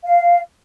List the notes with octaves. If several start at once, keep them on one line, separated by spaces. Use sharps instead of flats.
F5